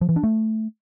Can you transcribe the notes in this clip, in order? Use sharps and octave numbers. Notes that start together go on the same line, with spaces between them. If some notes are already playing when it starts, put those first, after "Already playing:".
F3
E3
D4
A3